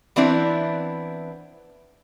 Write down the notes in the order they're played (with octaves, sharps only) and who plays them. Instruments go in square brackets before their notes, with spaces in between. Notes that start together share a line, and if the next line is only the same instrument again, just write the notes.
[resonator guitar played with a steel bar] E3 B3 C4 D4 E4